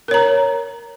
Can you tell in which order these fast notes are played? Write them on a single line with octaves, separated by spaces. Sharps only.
A#4 C#5 A#5